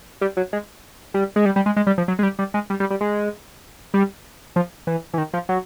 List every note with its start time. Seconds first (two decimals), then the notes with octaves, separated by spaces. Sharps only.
0.21 G3
0.37 F#3
0.53 G#3
1.14 G3
1.36 G#3
1.45 G3
1.56 G3
1.66 G#3
1.76 G#3
1.87 G3
1.98 F3
2.08 F#3
2.19 G#3
2.23 G3
2.39 G3
2.54 G#3
2.70 G3
2.80 G3
2.90 G3
3.01 G#3
3.94 G3
4.56 F3
4.87 E3
5.14 E3
5.18 D#3
5.34 F3
5.49 F#3